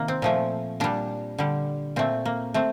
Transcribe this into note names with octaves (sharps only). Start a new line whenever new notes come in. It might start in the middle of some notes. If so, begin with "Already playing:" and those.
Already playing: C3 D#3 A#3
C4
A#2 F3 A3
A#2 G3 D4
D3 G3
A#2 A3 C4
A#3
A3 C4